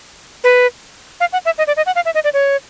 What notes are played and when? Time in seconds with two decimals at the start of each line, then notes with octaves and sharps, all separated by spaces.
0.44 B4
1.20 F5
1.33 F#5
1.45 E5
1.58 D#5
1.67 D5
1.77 D#5
1.86 F#5
1.96 F5
2.05 E5
2.15 D#5
2.24 D5
2.34 C#5